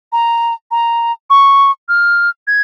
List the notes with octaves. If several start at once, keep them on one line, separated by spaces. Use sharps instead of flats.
A#5
A#5
C#6
F6
G#6